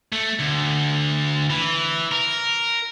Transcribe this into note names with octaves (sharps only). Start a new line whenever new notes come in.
A3
D2
E3
A#4